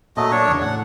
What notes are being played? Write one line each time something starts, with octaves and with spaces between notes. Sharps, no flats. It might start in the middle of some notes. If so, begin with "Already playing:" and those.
A#2 F#3 A3 D#5
D4 C#5
E2 C#3
A2 F#5